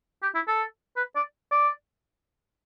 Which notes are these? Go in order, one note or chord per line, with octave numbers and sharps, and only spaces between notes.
G4
E4
A4
B4
D5
D5